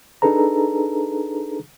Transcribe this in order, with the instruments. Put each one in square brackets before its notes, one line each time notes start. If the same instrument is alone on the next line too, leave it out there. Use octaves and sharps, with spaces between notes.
[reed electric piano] D4 D#4 G#4 A4 B4 A#5